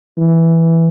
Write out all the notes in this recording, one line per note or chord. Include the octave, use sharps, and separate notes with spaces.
E3